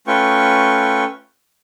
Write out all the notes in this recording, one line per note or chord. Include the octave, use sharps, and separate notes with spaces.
A3 C#4 F4 B4 G5 C#6